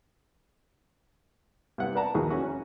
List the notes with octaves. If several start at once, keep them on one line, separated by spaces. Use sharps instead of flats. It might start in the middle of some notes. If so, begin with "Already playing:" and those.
G2 C3 F#5
B4 D5 F#5 A5 A#5
A#1 D#2 E3 F#4 G#4
C#4 F#4
C#4